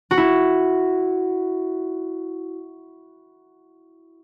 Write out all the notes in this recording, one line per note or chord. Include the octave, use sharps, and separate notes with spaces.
F#4
E4